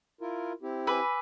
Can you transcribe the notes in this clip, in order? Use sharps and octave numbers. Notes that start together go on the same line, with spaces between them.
E4 F4 A#4
C4 E4 G4
B4 G#5 D6 E6